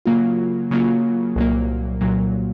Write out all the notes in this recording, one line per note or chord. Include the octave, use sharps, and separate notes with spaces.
C#3 F#3 A#3 F4
C#3 F#3 A#3 F4
C2 A#2 F#3 A#3
C2 A#2 F#3 A#3